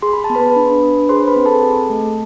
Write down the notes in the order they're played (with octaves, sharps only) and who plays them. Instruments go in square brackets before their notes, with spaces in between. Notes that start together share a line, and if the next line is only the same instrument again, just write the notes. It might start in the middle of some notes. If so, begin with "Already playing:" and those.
[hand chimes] G#4 C6
B5
A5
B3
B4 B5
D4
D4
G#4 C5 C6
B4 B5
C4
A4 A5
G#4
A3